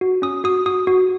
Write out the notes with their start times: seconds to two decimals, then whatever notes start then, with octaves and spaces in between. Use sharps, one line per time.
0.01 F#4
0.22 C#4 D#6
0.44 F#4 D#6
0.66 F#4 D#6
0.87 F#4